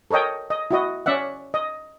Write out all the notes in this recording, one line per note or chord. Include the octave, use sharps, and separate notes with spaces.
A4 A#4 C#5 D#5 G5
D#5
E4 F#4 D#5
C#4 D5 E5 F#5
D#5